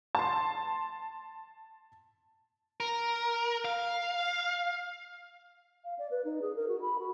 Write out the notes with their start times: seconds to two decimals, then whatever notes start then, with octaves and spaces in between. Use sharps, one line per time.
0.15 A5 C6
2.80 A#4
3.65 F5
5.84 F5
5.99 D5
6.11 B4
6.25 D#4
6.41 G#4
6.56 A#4
6.68 F#4
6.81 B5
6.98 F#4